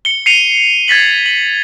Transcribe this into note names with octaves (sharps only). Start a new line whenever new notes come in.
C#7 G7
C7 C#7 D#7 F7
G#6 A6 B6 F#7
F#7